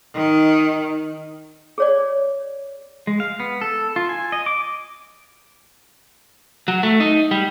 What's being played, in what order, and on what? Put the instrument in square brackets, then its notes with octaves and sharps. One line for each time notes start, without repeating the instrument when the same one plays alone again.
[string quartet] D#3
[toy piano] G#4 C#5 D5
[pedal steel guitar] G#3
F5
B3
A4
F4
G#5
D#5
D6
[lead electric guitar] F#3
A3
D#4
G3